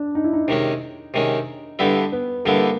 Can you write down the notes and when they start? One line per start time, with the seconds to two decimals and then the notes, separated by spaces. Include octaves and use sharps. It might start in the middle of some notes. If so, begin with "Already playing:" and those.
Already playing: D4
0.15 D#4
0.24 E4
0.33 D#4
0.48 C3 D#3 G#3 C#4
1.14 C3 D#3 G#3 C#4
1.79 G2 D3 G3 B3 E4
2.12 B3
2.45 G2 D3 G3 A#3 B3 E4